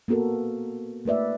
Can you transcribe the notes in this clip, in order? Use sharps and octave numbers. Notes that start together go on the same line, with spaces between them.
A#3 B3 F#4 A4 A#4
A3 A#3 B4 D5 E5